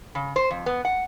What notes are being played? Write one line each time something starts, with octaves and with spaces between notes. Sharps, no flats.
C#3
C5
F2
B3
F#5